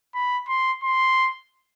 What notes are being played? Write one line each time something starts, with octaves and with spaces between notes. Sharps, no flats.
B5
C6
C6